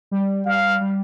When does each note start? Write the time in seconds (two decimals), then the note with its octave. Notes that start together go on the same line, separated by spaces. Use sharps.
0.11 G3
0.45 G3 F5
0.81 G3